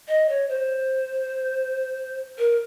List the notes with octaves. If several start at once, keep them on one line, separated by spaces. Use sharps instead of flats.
D#5
C#5
C5
A#4